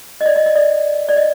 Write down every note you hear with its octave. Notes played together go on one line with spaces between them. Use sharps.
D#5
D5
D#5
D#5
D5
D5
D#5